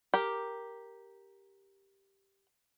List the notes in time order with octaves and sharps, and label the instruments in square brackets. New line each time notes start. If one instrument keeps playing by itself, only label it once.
[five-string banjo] G4 A#4